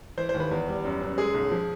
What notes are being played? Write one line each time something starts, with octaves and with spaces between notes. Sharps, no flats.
E3 C5
C5
D#2
B4
E2
G3
F#2
F#2
G#3 G#4
B1
F3